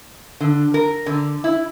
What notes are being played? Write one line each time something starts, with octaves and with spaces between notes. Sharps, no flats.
D3
A#4
D3
E4